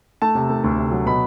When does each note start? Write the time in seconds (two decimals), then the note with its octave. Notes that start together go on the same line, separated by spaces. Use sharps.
0.22 A3 A5
0.35 C3
0.50 A3
0.64 D2
0.78 C3
0.92 F#3
1.06 B2 B5